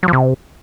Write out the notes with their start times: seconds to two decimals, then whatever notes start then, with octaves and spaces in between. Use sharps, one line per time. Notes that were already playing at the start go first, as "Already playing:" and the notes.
0.03 F#3
0.08 F3
0.13 C3